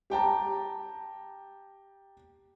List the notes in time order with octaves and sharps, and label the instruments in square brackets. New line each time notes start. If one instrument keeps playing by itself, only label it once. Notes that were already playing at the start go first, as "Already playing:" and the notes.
[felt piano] G4 G5 A5 A#5